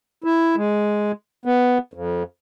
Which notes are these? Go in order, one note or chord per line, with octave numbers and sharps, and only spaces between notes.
E4
G#3
B3
F2